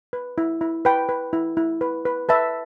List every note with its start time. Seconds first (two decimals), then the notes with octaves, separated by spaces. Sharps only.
0.13 B4
0.38 E4
0.61 E4
0.85 B4 G5 B5
1.09 B4
1.33 E4
1.57 E4
1.81 B4
2.05 B4
2.29 B4 E5 A5